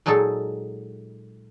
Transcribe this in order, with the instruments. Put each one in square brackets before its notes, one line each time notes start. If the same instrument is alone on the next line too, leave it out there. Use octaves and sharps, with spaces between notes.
[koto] A#2 F#3 G#3 D#4 A4